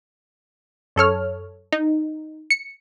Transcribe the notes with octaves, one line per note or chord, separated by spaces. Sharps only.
F#2 A4 C#5 F6
D#4
C#7